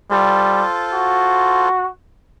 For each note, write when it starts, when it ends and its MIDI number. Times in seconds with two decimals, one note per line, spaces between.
0.11 0.63 55
0.11 1.69 65
0.11 1.69 69
0.11 1.69 72
0.93 1.88 66